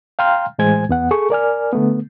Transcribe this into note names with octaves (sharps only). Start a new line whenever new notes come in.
F5 G5 A#5 C6 F6
A2 E3 G#3 C5 G#5 G#6
E2 B3 F#5
G#4 A4 C#6
A#4 D5 G#5 F6
D3 A3 B3